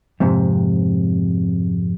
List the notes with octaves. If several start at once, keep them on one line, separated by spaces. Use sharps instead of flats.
F2 G#2 C3